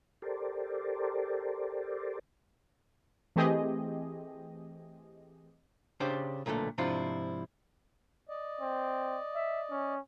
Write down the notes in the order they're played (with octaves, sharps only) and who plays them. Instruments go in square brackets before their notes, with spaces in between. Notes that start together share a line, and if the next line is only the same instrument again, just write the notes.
[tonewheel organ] G4 A4 A#4 C5 D5
[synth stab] E3 A3 C4 G4 G#4 D#5
[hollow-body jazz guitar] C#3 D4 G4 C5
B1 A#2 D3 G#3 A3
G#2 C3 F3 D4 E4 F4
[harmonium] D5 D#5
[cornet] C4
E5
C#4